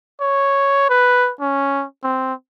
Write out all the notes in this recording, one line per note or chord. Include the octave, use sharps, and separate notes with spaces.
C#5
B4
C#4
C4